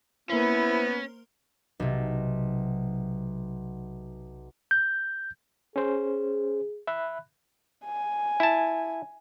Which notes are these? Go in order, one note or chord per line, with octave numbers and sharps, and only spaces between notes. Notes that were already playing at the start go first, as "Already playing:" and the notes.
A#3 B3 C#4 E4 C5
B1 C3
G6
C#4 G#4 C5
E5 B5 F#6
G#5
E4 A5